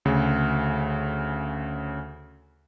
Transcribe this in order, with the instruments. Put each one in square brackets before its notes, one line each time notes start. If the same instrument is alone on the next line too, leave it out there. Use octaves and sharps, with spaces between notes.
[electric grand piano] D2 C#3